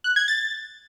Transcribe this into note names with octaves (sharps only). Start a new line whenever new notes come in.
F#6
G#6
A6